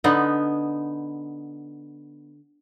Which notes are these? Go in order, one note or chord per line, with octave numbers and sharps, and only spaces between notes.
D3 B3 D#4